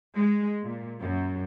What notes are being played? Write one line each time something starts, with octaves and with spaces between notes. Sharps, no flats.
G#3
A#2
F#2